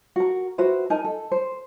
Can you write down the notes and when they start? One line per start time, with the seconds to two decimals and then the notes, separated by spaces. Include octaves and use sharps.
0.16 F#4 A#4
0.58 F#4 B4 C5 E5
0.90 D#4 A#4 G#5 A5
1.04 A4
1.32 C5